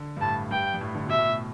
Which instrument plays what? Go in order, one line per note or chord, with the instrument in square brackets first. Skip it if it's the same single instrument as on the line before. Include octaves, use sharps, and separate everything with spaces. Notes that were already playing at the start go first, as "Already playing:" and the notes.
Already playing: [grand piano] D3
G2
[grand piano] A2 [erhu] A5
[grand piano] G2 [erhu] G5
[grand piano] G2
A2
D3
[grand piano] B2 [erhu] E5
[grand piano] A2
B2